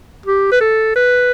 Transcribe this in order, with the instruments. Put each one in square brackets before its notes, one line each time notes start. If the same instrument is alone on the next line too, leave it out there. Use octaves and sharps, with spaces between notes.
[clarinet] G4
B4
A4
B4